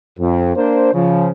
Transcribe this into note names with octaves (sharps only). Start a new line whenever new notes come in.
F2
A#3 D4 C5
C#3 F3